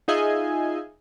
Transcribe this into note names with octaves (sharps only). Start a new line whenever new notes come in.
D#4 F4 G#4 D#5 E5 G#5